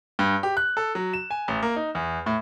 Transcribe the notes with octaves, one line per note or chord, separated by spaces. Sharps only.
G2
G4
F#6
A4
F#3
E7
G#5
A1
A#3
D#4
E2
A2